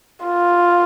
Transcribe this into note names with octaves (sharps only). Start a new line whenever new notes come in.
F4